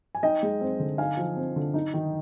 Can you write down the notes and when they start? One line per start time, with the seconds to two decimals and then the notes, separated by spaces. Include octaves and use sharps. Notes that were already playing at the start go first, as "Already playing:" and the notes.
0.15 G#5
0.23 D#4 D#5 G5
0.43 G#3
0.61 C4
0.80 D3
0.98 D#4 F5 G#5
1.17 F3
1.36 C4
1.56 D3
1.74 D#4
1.94 D#3